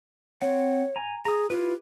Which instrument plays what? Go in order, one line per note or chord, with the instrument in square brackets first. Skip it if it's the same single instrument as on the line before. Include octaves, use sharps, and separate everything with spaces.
[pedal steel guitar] C4 F#5 [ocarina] C#5
[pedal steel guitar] G#5 A#5
[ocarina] G#4 [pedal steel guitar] A#5 D#6
[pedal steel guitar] E4 G4 B4 [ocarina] F4